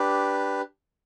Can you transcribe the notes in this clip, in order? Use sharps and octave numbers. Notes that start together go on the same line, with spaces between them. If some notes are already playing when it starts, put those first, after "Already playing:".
Already playing: D4 G4 B4